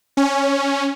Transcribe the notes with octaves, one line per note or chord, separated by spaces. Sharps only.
C#4